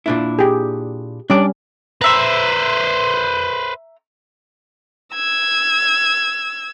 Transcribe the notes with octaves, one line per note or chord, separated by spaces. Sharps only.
A#2 D4 E4
G4 G#4
G3 C#4 D4 D5
B4 C5 E5 A#5
E6 G#6